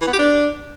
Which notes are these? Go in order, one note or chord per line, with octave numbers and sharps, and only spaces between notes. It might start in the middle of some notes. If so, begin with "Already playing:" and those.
E3
B3
G4
D4